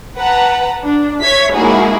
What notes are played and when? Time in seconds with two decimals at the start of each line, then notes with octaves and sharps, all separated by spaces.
0.19 B4 F#5 A5 A#5
0.83 D4
1.22 C#5 E5 G#6 B6
1.54 G#3 A#3 D#4 E4 F#4 G#4